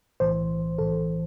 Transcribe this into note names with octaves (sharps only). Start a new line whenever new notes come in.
B1 A2 E3 C5
B1 A2 E3 A4